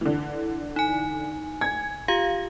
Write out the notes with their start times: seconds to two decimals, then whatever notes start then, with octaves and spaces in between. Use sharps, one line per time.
0.01 D3 E3
0.76 D#4 G#5
1.61 G#5 G#6
2.08 F4 G4 F5